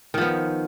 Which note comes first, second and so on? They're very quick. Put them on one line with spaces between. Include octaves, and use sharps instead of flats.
D#3 F3 B3